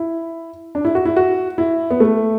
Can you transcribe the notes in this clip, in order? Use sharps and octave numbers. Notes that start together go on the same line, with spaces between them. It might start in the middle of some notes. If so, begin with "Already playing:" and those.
Already playing: E4
D4
E4
F#4
E4
F#4
E4
B3
A3